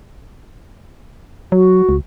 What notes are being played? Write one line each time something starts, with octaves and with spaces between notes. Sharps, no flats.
F#3 F#4
C#2